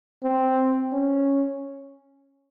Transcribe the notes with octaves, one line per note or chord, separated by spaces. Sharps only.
C4
C#4